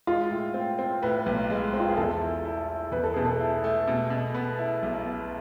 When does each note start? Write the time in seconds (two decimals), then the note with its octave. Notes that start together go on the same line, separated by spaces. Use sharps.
0.07 G#3 F4
0.31 A2
0.54 C4
0.79 C4
1.03 A2 B4
1.26 B1
1.50 G#3
1.74 C4
1.80 F4
1.89 G#4
1.97 E2 A4
2.20 E4
2.45 E4
2.69 E4
2.92 E2 B4
3.04 A4
3.14 B2 G#4
3.25 A4
3.40 E4
3.64 A3
3.87 B2
4.10 B2
4.34 B3
4.59 E4
4.83 B1
5.06 B3